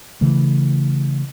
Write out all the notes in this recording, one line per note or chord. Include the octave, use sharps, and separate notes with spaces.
C#3 E3 A3